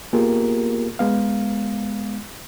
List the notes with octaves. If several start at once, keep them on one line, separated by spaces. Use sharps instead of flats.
A#3 B3 F4 G4 G#4 A#4
G#3 B3 F5